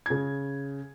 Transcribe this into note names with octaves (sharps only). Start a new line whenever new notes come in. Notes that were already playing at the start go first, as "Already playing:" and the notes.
C#3 G#6